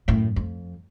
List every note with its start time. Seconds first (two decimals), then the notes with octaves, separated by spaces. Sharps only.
0.08 F#2 A2
0.36 F2